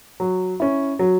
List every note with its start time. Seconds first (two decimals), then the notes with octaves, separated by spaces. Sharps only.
0.20 F#3
0.60 C#4 E4
0.99 F#3